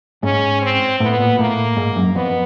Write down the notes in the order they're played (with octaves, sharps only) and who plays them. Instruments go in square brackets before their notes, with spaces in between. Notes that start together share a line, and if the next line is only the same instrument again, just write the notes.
[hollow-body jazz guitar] G#2 [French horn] C#4
[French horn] C4
[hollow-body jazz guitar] A2 [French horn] B3
[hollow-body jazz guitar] A#2
[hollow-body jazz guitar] A2 [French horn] A#3
[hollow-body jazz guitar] G#2
F#2
[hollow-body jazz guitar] F2 [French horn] B3